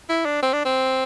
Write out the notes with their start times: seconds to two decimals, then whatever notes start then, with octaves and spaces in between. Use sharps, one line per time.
0.09 E4
0.25 D4
0.42 C4
0.53 D4
0.65 C4